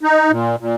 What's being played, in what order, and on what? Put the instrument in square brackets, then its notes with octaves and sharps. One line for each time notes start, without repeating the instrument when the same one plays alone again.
[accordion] D#4
A#2
A#2